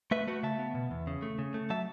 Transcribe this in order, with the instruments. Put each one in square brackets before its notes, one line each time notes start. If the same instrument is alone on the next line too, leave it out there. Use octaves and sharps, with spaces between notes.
[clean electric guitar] A3 B4 E5
A3 F#4 B4
C#3 E5 A5
B3
B2
E2
C#3
A3
C#3
A3
F#3 E5 A5